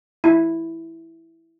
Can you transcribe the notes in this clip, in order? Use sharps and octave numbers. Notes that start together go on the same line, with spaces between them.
E4